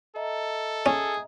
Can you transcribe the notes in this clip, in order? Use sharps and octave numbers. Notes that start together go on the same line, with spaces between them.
A4 D#5 E5 A#5
C#4 G#4